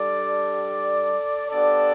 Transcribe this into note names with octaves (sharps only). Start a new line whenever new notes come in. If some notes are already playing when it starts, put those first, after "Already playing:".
Already playing: G3 D4 G4 A4 D5
B3 D4 G4 A4 D5